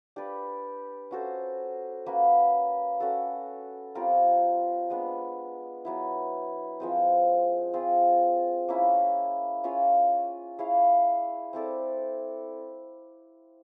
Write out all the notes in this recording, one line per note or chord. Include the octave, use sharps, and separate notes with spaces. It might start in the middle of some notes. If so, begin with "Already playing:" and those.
D4 G4 B4 D5
C#4 F#4 A4 C5
A#3 C#4 F#4 B4
C#4 F#4 A4
G3 C4 F4 A#4
G#3 B3 D4
F#3 B3 E4
F3 G#3 C4
C4 F4 G#4
A#3 C#4 E4
C#4 F4 G#4 C#5
E4 G#4 C#5 F5
C4 E4 A4 D5